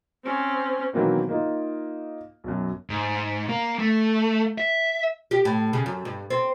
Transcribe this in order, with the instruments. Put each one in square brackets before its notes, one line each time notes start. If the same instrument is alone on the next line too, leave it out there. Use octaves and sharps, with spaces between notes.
[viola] C4 C#4
[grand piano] B2 D#3 E3 F#3 A#3 C4
A#3 D#4 F4
B1 F#2
[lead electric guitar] G#2
A#3
A3
E5
[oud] G4
A2
C#3
F#2
G2
C4